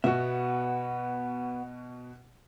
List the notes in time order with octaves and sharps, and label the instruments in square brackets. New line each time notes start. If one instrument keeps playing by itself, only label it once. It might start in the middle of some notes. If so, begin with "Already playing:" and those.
[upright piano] B2 F#4 [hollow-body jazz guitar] B3 E5